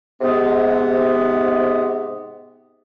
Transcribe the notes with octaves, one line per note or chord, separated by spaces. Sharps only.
G#2 C3 B3